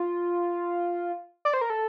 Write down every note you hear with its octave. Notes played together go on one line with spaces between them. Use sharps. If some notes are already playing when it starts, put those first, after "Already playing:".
Already playing: F4
D5
C5
A#4
A4